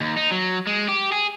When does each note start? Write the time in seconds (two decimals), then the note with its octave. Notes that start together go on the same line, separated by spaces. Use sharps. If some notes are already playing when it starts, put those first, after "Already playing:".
0.01 D#2
0.17 D#4
0.31 F#3
0.67 G#3
0.89 G4
1.12 G#4